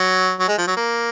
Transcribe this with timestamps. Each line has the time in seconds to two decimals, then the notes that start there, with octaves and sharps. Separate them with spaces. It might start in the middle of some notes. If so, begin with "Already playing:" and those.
Already playing: F#3
0.40 F#3
0.48 G#3
0.58 F3
0.67 F#3
0.77 A#3